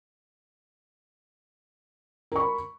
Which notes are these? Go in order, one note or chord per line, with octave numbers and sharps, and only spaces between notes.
A#4 B5 C#6